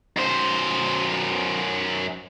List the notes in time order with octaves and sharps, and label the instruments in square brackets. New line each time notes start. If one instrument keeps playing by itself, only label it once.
[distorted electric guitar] F#2 C5